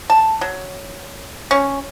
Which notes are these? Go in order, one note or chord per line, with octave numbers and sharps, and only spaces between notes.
A5
F#3
C#4